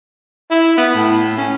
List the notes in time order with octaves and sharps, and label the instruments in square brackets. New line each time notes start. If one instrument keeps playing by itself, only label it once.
[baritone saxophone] E4
B3
A2
C#4